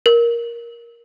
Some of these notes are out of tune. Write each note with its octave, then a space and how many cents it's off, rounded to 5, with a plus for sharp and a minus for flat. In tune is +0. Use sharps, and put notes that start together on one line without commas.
A#4 +10